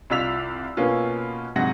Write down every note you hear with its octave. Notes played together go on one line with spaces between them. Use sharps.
C2 F4 D5 E6 B6 F7
B2 A#3 B3 C#4 F4
G#2 C3 F#3 F#5 A#6